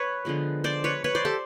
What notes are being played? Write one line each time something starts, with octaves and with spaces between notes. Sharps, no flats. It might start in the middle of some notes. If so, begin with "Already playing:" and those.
Already playing: B4 C#5
D3 F3 G#3 B3
C5 D5
B4 C#5
B4 C#5
C5 D5
G4 A4